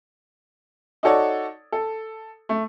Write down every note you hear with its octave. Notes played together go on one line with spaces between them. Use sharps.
D#4 F#4 A4 C#5 D5
A4
A3